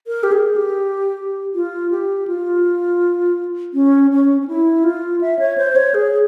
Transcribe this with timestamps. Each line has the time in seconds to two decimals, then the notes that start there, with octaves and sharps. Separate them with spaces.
0.07 A#4
0.23 G4
0.32 G#4
0.56 G4
1.54 F4
1.91 G4
2.27 F4
3.74 C#4
4.11 C#4
4.41 C#4
4.48 E4
4.84 F4
5.21 E5
5.39 C#5
5.58 C5
5.76 C#5
5.94 G#4